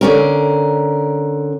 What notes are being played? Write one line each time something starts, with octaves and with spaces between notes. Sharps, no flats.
D3 C#4 A#4